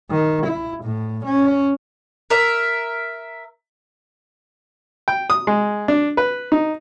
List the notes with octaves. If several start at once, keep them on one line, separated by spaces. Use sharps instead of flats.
D#3
E4
A2
C#4
A#4 E5
G5
D#6
G#3
D4
B4
D#4